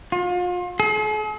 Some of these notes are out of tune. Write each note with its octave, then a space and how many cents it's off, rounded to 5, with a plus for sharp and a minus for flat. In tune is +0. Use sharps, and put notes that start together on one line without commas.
F4 +35
G#4 +45